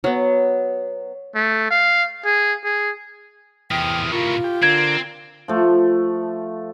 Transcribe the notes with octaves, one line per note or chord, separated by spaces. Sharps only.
F#3 B3
A3
F5
G#4
G#4
E2 A2 C3 G5 D#6 F6
F4 A#4 B5 C#6
G4
D3 C4 A#4 G#6
F3 A3